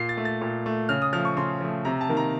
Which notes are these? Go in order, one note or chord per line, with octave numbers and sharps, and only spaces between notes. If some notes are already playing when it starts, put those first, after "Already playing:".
Already playing: A#2 C7
A6
A3
A6
A#2
A3
C#3 F6
D#6
F3 A3 F6
C#6
C#3 C6
F3 A3
C3 A#5
A5
D#3 A#3
A#5